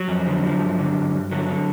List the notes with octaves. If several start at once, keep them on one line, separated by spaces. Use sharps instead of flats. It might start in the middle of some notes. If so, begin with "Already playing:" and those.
Already playing: F#3
F2
D3
F3
G2
D3
G2
G2
D3 F#3
D3